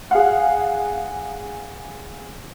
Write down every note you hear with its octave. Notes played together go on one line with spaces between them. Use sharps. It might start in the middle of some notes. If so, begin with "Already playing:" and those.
G#4 F5 F#5